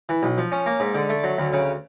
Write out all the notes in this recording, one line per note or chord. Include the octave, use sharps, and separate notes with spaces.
E3
B1
F3
C#4
A#3
G#2
D3
A3
F#3
D2
C#3